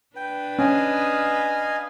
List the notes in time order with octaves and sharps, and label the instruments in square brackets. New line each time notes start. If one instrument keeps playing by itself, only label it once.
[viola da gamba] D4 B4 [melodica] G5
[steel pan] C#4 [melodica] D#5 F5 G#5